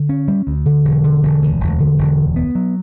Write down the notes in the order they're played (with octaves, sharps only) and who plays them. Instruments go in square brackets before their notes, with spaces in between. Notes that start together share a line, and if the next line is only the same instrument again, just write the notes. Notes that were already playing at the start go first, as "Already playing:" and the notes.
Already playing: [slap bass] D3
C#4
G3
D2
D3
E1
D3
E1
D2
E1
D3
E1
D2
B3
F#3